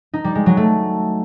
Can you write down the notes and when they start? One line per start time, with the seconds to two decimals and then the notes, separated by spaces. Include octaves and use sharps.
0.14 D#4
0.24 G3
0.35 G#3
0.46 F#3
0.57 A3